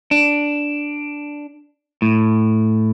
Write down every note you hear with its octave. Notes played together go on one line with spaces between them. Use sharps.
D4
A2